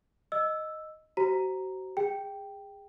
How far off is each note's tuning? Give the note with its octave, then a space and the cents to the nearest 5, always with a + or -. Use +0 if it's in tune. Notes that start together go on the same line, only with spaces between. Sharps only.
D#5 +0 E6 +0
F#4 +35 C5 +0 A#5 +0
G#4 -25 G5 +0